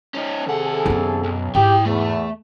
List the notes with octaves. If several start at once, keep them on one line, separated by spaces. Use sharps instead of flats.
C#4 D#4
D#2 C3 G#4 A4 F#5
F#2 B3
B1
G#2 E4 G4 G5
E2 A3